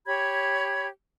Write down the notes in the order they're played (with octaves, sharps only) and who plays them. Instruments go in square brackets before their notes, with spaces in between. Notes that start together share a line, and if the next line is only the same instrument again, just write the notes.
[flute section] G4 C#5 B5 G#6